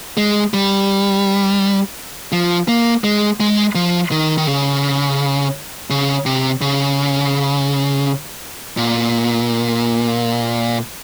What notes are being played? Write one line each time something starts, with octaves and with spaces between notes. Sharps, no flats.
G#3
G3
F3
A#3
G#3
G#3
F3
D#3
D#3
C#3
C#3
C3
C#3
A#2